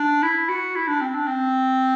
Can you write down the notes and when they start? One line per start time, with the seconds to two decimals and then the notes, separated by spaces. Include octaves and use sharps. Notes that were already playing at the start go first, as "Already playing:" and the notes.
Already playing: D4
0.23 E4
0.49 F#4
0.76 E4
0.88 D4
1.01 C4
1.15 D4
1.27 C4